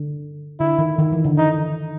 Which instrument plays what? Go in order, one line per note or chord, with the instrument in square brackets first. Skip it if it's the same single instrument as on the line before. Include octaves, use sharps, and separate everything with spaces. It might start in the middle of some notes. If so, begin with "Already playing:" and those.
Already playing: [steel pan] D3
[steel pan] D3 [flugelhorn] E4
[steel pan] D#3
D#3
E3
D3
[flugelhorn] D#4